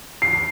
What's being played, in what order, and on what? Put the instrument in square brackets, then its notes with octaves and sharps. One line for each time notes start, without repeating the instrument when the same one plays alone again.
[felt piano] C7